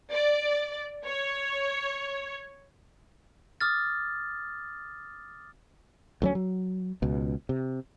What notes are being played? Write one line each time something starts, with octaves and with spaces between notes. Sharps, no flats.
D5
C#5
D6 D#6 F6 A6
D2 F#3 C#4
F#3
C#2 B2
C3